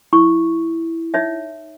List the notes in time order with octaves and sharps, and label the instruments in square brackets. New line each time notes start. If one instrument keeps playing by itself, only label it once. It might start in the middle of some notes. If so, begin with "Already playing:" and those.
[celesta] E4 [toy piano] C#6
[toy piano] D#4 C#5 E5